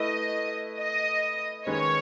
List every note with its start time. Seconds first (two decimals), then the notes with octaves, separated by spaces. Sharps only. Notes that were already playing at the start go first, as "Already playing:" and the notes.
Already playing: A3 E4 B4 D#5
0.78 D#5
1.67 D#3 G#3 C#4 G#4 B4 C#5